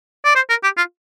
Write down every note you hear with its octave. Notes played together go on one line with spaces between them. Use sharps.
D5
C5
A#4
G4
F4